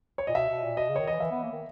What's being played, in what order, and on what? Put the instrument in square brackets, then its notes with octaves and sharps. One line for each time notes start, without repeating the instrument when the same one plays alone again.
[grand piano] C#5
[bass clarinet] A#2 [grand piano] D#5
[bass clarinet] B2 [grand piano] E5
[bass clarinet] B2
A#2
[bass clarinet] B2 [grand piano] D#5
[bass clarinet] C#3
[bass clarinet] D#3 [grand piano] C#5
[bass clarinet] E3 [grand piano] D#5
[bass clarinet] E3 [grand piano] E5
[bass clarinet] B3
A#3
D#3